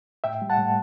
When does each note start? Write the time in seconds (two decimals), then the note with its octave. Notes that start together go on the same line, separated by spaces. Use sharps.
0.24 A2 E5 G5
0.42 G3
0.50 F#5 A5
0.58 A2